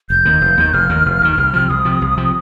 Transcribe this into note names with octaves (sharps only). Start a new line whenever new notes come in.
F1 G6
D#2 D#3
F1
D#2 D#3
F1 F6
D#2 D#3
F1
D#2 D#3
C2
C3 F3
C2 D#6
C3 F3
C2
C3 F3